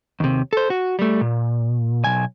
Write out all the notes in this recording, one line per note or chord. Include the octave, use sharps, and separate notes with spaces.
D#2 C3
A4 C5
F#4
G3 A3
A#2
B1 G#5